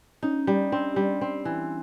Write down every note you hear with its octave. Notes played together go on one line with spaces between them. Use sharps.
C#4 D#4
G3
C4 D4
G3
C4
E3